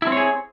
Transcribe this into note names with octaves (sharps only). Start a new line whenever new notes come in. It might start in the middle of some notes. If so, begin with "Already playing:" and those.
C4 E4 G#4 C#5